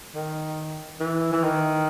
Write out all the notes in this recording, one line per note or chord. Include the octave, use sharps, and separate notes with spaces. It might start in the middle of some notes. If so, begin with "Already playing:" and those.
D#3
E3
E3
D#3